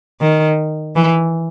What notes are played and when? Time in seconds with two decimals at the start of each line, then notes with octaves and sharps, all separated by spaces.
0.21 D#3
0.96 E3